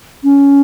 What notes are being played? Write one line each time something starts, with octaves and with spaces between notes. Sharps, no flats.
C#4